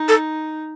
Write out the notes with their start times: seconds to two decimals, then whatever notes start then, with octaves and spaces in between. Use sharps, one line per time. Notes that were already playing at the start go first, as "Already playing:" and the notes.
Already playing: D#4
0.09 A4